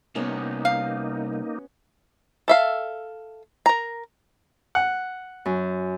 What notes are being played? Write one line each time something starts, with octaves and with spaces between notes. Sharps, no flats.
C2 A#3 B3 C#4 D#4 F#4
F5
A4 E5 F5
A#4 A#5
F#5
F#2